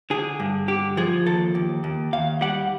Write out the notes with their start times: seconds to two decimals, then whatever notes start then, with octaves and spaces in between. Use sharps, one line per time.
0.10 D3 G#4
0.40 G2
0.68 D3 G4
0.97 F3 G#4
1.26 D#2 A4
1.55 D#2
1.84 D#2
2.13 D#2 F5
2.41 G3 F#5